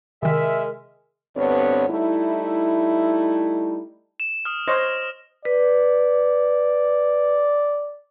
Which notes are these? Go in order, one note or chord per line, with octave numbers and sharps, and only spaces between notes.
C3 D#3 G#3 A#4 E5
D2 G2 B3 C4 C#5
G3 A3 D#4 E4
E7
D#6 F6
C5 C#5 D#5 F6 A#6
B4 D5